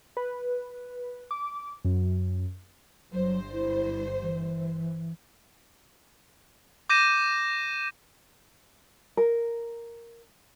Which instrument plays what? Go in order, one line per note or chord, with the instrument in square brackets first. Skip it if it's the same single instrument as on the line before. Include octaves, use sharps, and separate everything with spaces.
[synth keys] B4
D6
F#2
[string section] G1 G2 C5 [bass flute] F#3
[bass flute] E4
E3
[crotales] D6 G6 A#6 D#7 E7
[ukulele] A#4